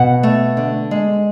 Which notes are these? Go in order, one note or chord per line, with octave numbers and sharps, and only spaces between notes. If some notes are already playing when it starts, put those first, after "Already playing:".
Already playing: B2 F#5
A3
D3
G#3